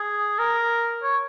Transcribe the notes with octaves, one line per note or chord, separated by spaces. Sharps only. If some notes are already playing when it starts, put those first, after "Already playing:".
Already playing: G#4
A#4
C#5